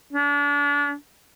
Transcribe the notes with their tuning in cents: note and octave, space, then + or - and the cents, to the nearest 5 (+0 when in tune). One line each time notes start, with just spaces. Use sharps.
D4 -35